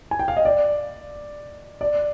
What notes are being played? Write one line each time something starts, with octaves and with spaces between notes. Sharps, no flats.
G#5
G5
F5
D#5
D5
D5